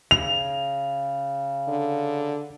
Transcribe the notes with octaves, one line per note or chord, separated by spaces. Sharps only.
C#3 F7
D3